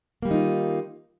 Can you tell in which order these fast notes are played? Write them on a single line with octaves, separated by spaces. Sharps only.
A#3 G3 D#3 D#4 F4